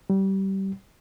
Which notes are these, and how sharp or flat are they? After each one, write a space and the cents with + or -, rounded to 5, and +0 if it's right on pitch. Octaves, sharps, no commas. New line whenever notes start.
G3 -25